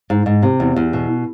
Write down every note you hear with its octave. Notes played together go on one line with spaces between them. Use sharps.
G#2
G#2
C3
E2
E2
B2